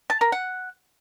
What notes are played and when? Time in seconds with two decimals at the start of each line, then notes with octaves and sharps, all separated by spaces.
0.10 A5
0.21 A#4
0.32 F#5